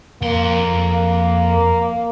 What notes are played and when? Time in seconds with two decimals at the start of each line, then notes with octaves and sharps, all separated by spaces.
0.22 F2 A#3 C6